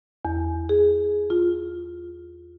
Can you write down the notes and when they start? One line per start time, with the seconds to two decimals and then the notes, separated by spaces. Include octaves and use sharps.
0.25 E2
0.69 G#4
1.30 F4